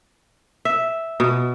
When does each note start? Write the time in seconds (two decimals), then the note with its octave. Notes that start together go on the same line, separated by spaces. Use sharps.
0.65 E5
1.20 B2